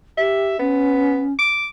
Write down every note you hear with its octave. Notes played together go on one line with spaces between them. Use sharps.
G4 E5
B3 C#4
D6